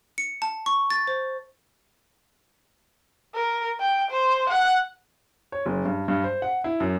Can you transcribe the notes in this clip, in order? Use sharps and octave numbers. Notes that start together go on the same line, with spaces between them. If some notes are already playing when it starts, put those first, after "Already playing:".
C#7
A5
C#6
A6
C5
A#4
G5
C5
F#5
C#5
F#1
G2
G2
C5
F#5
E4
F#2